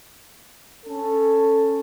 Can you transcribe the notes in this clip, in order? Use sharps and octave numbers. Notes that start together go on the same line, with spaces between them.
C#4 A4